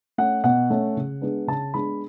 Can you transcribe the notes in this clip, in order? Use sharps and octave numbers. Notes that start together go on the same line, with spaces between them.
A3 C#4 F#5
B2 F#5
A3 C#4
C#3
G#3 B3 D4
C#3 A5
G#3 B3 D4 B5